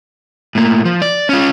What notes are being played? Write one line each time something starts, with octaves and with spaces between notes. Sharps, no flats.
A2 A#3
F3
D5
C#4 F4